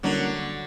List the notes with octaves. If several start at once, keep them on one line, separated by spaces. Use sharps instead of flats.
D3 F#3 G3 A#3 C#4 E4 A#4